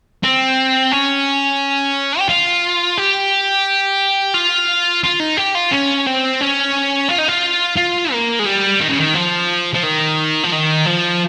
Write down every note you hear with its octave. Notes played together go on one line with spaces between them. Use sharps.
C4
C#4
G4
F4
G4
F4
F4
D#4
G4
F4
C#4
C4
C#4
F4
D#4
F4
F4
A#3
G#3
G3
D#3
C#3
D#3
F3
F3
D#3
F3
D#3
F3